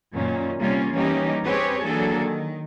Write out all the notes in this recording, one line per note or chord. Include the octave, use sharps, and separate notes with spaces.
F#2 A#2 D#3 C#4
C3 G3 A#3 C#4 F4
E3 G3 A#3 C#4 D#4 G4
C4 C#4 G4 G#4 B4 C#5
E3 F#3 A#3 D4 G#4 A4
D#3